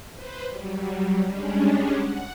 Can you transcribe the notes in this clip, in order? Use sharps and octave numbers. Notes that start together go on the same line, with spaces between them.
B4 C5
F#3 G3
G3 G#3 C#4 D4
F#5